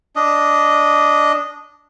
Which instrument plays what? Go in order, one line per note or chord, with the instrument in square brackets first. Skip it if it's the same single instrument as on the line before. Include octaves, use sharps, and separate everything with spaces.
[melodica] D4 D#5